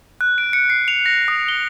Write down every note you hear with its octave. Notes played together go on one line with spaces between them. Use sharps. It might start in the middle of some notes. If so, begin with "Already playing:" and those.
F#6
D7
C#7
C7
F7
A#6
D#6
G7